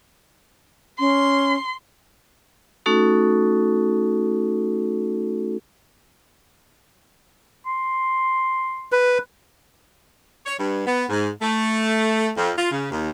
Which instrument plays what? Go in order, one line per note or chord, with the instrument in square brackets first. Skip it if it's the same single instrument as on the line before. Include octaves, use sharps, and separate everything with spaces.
[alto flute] C#4 [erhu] C6
[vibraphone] A3 C#4 D#4 F#4 A4
[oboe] C6
[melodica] B4
[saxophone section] C#5
G2
B3
G#2
A3
F2
F4
C#3
D#2